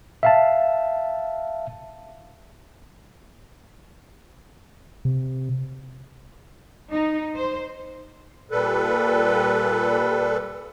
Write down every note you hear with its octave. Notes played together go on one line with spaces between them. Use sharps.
E5 F5 A5
C3
D#4
C5
A#2 G3 A4 B4